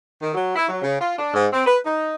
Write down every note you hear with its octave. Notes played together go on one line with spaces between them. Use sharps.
D#3
F#3
E4
F#3
C#3
F4
D4
G#2
C4
B4
D#4